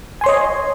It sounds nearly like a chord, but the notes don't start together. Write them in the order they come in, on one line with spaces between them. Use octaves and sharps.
G#5 C6 C#5 D#5